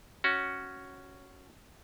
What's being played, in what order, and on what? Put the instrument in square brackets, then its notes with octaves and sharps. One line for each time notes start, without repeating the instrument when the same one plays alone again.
[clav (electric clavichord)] C#4 F#4